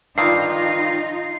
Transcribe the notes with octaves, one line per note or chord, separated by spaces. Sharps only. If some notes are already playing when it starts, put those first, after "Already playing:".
G2 D3 D#3 D#4 F4 C7